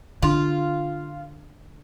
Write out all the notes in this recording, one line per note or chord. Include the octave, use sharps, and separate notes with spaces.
D3 F4